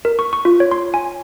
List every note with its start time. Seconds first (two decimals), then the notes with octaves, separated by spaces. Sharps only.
0.05 A#4
0.19 C#6
0.33 C#6
0.45 F4
0.60 C#5
0.71 C6
0.94 G#5